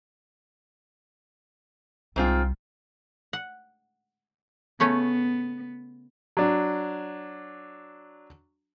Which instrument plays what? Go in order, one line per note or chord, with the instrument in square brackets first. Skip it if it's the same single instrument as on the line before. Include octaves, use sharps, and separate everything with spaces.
[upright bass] C2 G3 [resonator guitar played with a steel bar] G#2 C4 F4
[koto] F#5
[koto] C#3 A3 C#4 [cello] B3
[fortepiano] F#3 D4